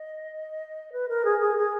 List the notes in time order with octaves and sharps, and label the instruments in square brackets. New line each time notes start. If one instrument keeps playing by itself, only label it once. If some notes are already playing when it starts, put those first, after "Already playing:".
Already playing: [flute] D#5
B4
A#4
G#4
G#4
G#4